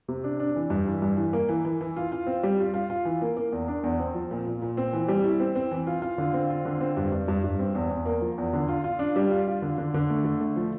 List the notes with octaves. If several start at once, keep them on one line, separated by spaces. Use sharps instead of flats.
C3
D4
D4
E3
G2
E3
G2
E3
A#3
E3
E3
E3
F4
F4
C4
G3
F4
F4
F4
E3
A#3
A#3
E2
D4
E2
C4
F3
A#2
A#2
A#2
C4
E3
G3
E4
C4
C4
E3
F4
F4
D3
C4
F4
D3
C4
G2
G2
G2
G2
C4
E2
E2
A#3
F3
E2
D3
F4
F4
D4
G3
F4
F4
D3
D3
D3
A3
D3
A3
F3